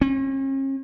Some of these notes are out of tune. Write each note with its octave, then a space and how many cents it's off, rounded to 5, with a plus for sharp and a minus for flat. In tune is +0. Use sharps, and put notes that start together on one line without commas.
C#4 -45